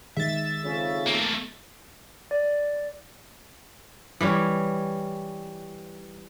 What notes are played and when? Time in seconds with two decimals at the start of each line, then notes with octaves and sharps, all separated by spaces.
0.17 D#3 G#3 E5 A6
0.63 F2 C#3
1.06 A3 A#3
2.31 D5
4.21 E3 G3 C#4